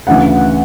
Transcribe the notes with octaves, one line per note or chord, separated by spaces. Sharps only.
D2 C#3 E3 F#5